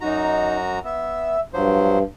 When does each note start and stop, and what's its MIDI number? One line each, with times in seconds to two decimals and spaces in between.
0.01 0.79 42
0.01 0.56 63
0.01 0.79 66
0.01 0.79 82
0.84 1.37 59
0.84 1.40 76
1.53 2.03 43
1.53 1.99 53
1.53 1.99 54
1.53 1.99 72